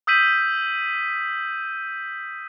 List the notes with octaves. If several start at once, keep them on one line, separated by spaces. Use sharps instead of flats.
D#6 E6 G6 B6 D#7 F#7